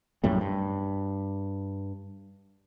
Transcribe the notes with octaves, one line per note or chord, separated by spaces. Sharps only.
A#1 F#2 A2 G3
G2